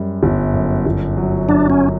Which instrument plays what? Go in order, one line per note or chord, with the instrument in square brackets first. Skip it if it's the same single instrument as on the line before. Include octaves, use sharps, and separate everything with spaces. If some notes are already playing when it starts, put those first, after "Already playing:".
Already playing: [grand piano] F#2 G3
G1
F#2
G1
F#3
[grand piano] F#3 [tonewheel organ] D4
[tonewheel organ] C#4